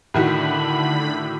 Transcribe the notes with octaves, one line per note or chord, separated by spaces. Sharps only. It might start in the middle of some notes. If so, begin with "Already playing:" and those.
A2 D3 D#3 F#4 B5